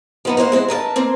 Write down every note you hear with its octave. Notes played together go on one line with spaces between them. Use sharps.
F3 B3 D#4
A#3 C5 C#5 F#5
G#3 C4 E4 C5
A#4 B4 D#5 A5
A#3 C4 C5